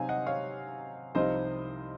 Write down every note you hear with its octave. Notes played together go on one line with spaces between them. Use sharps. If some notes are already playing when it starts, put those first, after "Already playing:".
Already playing: C3 F#3 C4 D#4 F5 G#5
D#5 F#5
C#5 F5
C2 C3 F3 C4 D#4 C5 D#5